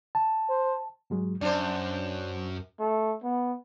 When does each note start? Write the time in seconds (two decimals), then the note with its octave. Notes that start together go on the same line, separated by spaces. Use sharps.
0.15 A5
0.49 C5
1.10 G#2 F#3 G#3
1.41 F#2 D4 C5 D5
2.80 A3
3.23 B3